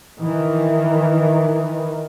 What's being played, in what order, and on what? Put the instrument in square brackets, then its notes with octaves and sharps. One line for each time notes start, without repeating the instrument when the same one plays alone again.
[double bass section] D#3 E3